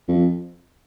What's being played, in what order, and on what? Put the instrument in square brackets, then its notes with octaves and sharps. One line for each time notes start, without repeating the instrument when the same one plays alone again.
[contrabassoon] F2